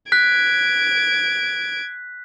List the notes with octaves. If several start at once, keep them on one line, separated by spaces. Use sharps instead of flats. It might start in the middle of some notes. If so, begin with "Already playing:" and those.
F#6 G#6 B6 D7